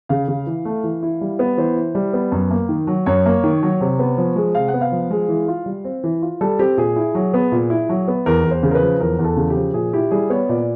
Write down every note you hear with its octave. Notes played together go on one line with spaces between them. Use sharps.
C#3 F5
C#3
E3
A3
E3
E4
G3
B3
E3 C5
E4
G3
B3
F#2
A#3
D#3
F#3
F#2 C#5
A#3
D#3
F#3
C3
B3
F3
G#3
C3 F5
F#5
B3
F5
F3
G#3
E3
F4
G3
C4
E3
F4
G3 A4
C4 G4
A#2 G#4
E4
F#3
B3
A#2
E4
F#3
B3
E2 A#4
E2
C5
C#3
A#4
B4
F3
E2 A#4
E2
A4
C#3
G4
F3
A#2 G#4
E4 G4
G3 G#4
B3 C#5
A#2 D5